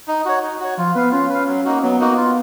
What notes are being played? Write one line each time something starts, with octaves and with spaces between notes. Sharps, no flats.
D#4
F#4 C#5
D#4
F#4 C#5
F3 F4
B3 B4 F5
C#4 F4
B4 F5
F#3
A#3 D#4 F#4
F#3 B3
A#3 D#4 F#4
F4